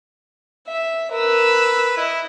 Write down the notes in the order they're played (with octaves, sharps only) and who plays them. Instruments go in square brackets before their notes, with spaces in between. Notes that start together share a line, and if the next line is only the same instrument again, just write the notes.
[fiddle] E5
[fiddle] A#4 E6 [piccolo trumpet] B4
[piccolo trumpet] E4 [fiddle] D#5